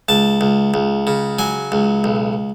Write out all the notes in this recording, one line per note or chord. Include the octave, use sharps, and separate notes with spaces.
C#2 A5
C#2
C#2
C#3
F#3 G#5
C#2
B1